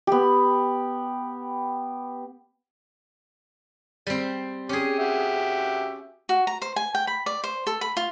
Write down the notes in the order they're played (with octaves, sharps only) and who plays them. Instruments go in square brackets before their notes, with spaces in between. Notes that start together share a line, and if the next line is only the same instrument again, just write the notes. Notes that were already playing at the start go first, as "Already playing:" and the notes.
[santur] B3 G4
[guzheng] G3 C4
[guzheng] C#4 G#4 [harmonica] G4
[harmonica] F#4 G4 E5
[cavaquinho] F#4
A#5
C5
G#5
G5
B5
D5
C5
A4
B5
F4